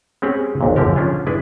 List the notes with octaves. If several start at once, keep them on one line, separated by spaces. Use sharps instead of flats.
G#3 C4 C#4 G4 G#4 F#5
G#1 D#2 A#2
F#2 D3 F3 G4 A#4
F3 C#4 D4 F4
G#3 D4 E4 B4